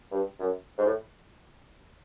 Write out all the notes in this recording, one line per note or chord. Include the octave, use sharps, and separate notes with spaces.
G2
F#2
G#2
A2